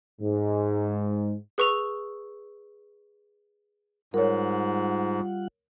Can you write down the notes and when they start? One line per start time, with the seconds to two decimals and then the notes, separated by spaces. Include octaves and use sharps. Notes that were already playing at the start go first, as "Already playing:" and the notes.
0.21 G#2
1.58 G#4 B4 C#6 E6 F7
4.14 G#2 G3 F4 A#4 C#5 F#5